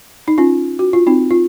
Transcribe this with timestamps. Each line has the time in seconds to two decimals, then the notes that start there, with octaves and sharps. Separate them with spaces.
0.28 D#4
0.38 C#4 F4
0.79 F#4
0.93 F4
1.07 C4 D#4
1.31 F4